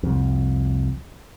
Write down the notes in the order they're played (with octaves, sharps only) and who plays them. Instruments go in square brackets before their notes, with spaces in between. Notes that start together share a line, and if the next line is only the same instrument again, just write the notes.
[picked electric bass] C2 F2